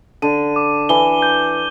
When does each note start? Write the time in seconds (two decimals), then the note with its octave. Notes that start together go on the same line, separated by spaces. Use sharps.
0.22 D3 D#7
0.56 D6
0.89 E3 G7
1.22 G6